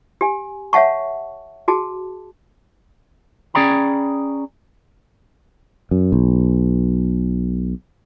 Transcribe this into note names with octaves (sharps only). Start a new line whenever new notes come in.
G4 G#5
C#5 E5 F#5 A5 C#6
F#4 G#4 A5
C#4 G#4 D5 G5 A#5 B5
F#2
B1